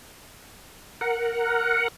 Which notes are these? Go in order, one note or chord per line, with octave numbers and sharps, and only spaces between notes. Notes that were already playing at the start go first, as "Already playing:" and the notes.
A#4 F#5